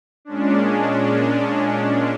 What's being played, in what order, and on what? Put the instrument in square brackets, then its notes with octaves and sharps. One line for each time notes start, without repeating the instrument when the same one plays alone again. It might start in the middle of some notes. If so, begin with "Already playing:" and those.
[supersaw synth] A#2 G#3 C#4 D4